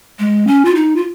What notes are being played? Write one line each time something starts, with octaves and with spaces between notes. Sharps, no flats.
G#3
C#4
F4
D#4
F4